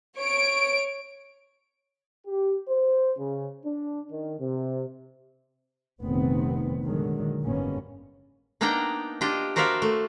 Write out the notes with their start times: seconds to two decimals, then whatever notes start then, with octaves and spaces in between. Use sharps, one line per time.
0.17 C#5 D7
2.26 G4
2.68 C5
3.18 C#3
3.64 D4
4.10 D#3
4.40 C3
6.01 F1 A#1 C3 D#3 B3 C4
6.83 A#2 D3 D#3 F#3 G#3
7.43 F#1 G#2 G3 A#3 B3 C#4
8.61 A#3 B3 D4 D#4 G5 A#5
9.21 D4 F4 G4 D#5
9.56 F#4 A#4 C5 D5 E5 F5
9.82 A3